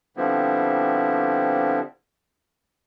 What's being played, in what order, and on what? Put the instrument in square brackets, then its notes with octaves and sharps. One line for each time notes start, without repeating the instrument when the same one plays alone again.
[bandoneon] D3 F3 G3 B3 C4 E4